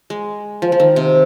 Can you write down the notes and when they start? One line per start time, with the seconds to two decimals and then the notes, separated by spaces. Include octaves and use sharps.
0.10 G#3
0.62 F3
0.72 F3
0.80 D#3
0.96 C3